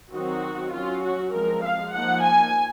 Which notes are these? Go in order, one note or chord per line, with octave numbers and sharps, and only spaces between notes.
D#3 F#3 C4 D#4 F#4
F#3 C#4 F4
F#4
F3 G#3 C4 A#4
F5
F3 A#3 D#4 F#5
G#5